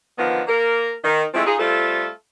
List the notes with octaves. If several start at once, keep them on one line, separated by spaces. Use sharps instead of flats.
D3 D#3 F3 B3
A#3 A#4
D#3
F3 G#3 A3 C4 E4
D#4 F4 G#4
G3 A3 C4 F4 A4